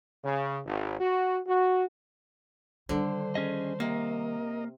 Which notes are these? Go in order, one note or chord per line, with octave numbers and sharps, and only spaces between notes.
C#3
G#1
F#4
F#4
D3 D#3 G3 C5
C#4 G#4 D#5
C3 A#3 A#4 D#5